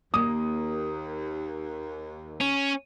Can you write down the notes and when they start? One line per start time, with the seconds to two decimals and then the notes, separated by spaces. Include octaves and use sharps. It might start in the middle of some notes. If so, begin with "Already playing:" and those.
0.14 D#2 A#3 D#6
2.41 C#4